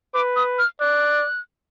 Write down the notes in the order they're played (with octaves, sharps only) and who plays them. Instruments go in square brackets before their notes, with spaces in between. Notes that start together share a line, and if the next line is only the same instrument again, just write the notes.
[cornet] B4 [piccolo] D6
[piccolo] D#6
F6
[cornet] D5 [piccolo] F#6